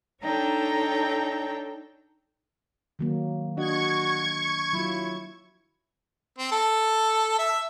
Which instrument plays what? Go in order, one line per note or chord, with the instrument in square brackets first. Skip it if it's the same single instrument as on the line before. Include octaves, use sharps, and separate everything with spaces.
[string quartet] D4 D#4 A4 C#5 G5 A#5
[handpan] D#3 F#3 A#3
[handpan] D4 D#5 [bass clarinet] F#4 [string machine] C#6 G#6
[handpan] F#3 F4 [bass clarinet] E4
[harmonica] C4
A4
E5 E6